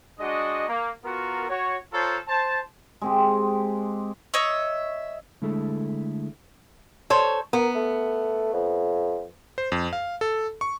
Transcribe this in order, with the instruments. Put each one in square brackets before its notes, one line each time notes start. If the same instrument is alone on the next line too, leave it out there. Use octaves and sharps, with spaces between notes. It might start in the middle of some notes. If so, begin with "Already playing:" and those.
[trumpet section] G#3 D4 F#4 D#5
A#3
B3 F4 F#4 A#4
F#4 C#5
F4 A4 C5 C#5 A5 A#5
C5 A5
[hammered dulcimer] G#3 C4 G4
[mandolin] C#5 D#5 E5 C#6
[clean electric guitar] D3 G#3 A3 E4 G#4 A4
[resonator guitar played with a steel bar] A4 C5 C#5
[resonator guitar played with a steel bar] B3 [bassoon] A#4
[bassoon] A3
F2
[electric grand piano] C5
F2
F5
A4
C#6